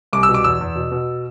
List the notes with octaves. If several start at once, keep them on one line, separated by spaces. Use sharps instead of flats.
C2 D6
E6
B2
D6
E2 E6
E2
B2
B2